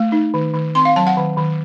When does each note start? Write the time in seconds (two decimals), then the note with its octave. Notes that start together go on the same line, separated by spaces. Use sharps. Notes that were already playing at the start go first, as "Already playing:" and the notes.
Already playing: A3
0.12 D#4
0.34 D#3
0.54 D#3
0.75 C4 C6
0.85 F5
0.96 F#3 A5
1.07 F#5
1.17 D#3
1.37 D#3